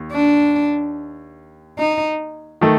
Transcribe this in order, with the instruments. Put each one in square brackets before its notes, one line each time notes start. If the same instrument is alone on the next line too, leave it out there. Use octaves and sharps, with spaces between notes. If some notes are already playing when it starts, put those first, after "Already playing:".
Already playing: [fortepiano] D#2
[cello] D4
D#4
[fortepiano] D#3 A3